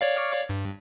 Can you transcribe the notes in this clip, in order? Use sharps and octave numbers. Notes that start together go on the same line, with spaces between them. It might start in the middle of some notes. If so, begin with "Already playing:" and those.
C#5 D5 F5
G2